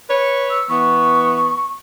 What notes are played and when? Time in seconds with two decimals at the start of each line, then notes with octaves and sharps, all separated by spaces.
0.08 B4 C#5
0.50 E6
0.69 E3 B3 C#6